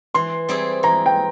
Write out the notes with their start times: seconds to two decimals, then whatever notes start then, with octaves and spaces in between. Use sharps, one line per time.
0.14 E3 C6
0.49 G3 C4 E4 G#4
0.83 E3 A#5
1.06 G5